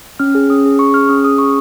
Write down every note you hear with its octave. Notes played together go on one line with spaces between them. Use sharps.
C#4 F6
G#4
C#4 D#6
G#4
C#4 C#6
G#4 F6
C#4 D#6
G#4 D#6
C#4 C#6